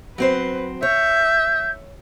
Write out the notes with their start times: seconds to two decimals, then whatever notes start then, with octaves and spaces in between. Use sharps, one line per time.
0.18 F#3 C4 B4 C5
0.83 C#5 E5 G6